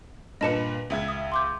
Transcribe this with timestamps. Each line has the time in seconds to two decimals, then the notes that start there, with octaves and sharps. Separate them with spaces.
0.41 G2 A#2 B4 D#5 A5 C#7
0.90 C#2 E5 G#6
1.08 D#6
1.32 C6 D6 G6